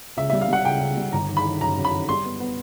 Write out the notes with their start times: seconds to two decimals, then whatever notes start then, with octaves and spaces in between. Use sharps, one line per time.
0.17 C#2 E5
0.30 G3 E5
0.41 F5
0.49 G3 F#5
0.65 C#2 G5
0.81 C#2
0.97 G3
1.13 G1 A#5
1.29 D#3
1.37 B5
1.45 D#3
1.61 F#2 A#5
1.77 F#2
1.85 B5
1.93 D#3
2.09 G3 C6
2.24 B3
2.40 B3